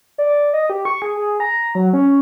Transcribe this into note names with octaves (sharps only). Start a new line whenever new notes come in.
D5
D#5
G4
C#6
G#4
G#4
A#5
F#3
C#4